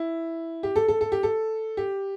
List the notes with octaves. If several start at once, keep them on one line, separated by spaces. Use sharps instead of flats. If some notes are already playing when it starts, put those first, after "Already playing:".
Already playing: E4
G4
A4
A4
A4
G4
A4
G4